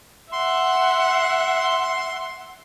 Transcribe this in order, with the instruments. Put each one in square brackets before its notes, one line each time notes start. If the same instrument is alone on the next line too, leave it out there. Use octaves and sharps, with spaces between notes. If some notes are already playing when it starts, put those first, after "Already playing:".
[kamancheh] E5 F#5 [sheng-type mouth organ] C6